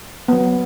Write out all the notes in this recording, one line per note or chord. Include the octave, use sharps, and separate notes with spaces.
F#3 B3